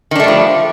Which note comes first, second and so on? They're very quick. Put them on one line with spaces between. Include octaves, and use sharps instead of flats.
D#3 D4 A3 G3 F3